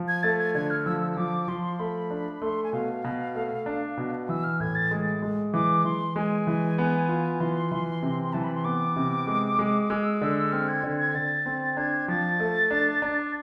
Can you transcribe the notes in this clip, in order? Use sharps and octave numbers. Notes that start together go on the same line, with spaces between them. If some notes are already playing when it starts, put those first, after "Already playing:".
Already playing: F3
G#6
A3 A6
G#6
D3 G#6
F6
F3 E6
E6
F3 D6
F3 C6
A3 B5
D4
A3 C6
G#5
B2 F5
B2
A3
D4
B2
E3 E6
F6
A2 G#6
A6
G#3
G#3
E3 D6
E3 C6
G#3 G#5
E3
B3
F4
E3 C6
E3
C3
E3 A5
B5
C6
B3 D6
C3
G#3
G#3
G#3 E6
D3
C4 F6
G#6
D3
G#6
D3 A6
C4
D4 G#6
F3 A6
A3
D4
D4